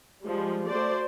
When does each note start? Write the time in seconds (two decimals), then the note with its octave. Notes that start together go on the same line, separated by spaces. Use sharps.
0.24 F3 G3 G#3
0.70 A3 F#4 C5 D5